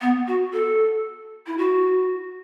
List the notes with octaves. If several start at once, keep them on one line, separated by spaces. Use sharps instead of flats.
B3
F#4
A4
E4
F#4